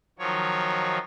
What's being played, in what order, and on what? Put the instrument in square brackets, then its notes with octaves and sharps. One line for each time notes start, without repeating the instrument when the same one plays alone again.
[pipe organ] D#3 F3 F#3 C#5